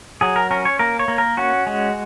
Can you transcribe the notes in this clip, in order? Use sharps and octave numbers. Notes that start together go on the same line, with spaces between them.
F#3 G#4
A#4
C#4 A#4
C#5
A#3 A#4
C#5
A#3
A#4
C#4 F#4
G#3